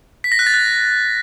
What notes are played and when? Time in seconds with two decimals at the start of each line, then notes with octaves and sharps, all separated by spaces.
0.24 B6
0.32 A#6
0.39 F#6
0.47 A6
0.54 F#6